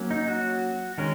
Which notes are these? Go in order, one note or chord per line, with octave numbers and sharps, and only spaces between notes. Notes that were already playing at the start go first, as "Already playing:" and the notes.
Already playing: F#3 A#3 C#4
D#4
F#4
D#3 G#3 C#4 A#4